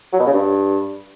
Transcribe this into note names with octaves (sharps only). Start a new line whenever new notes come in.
F#3
B2
C#3
G2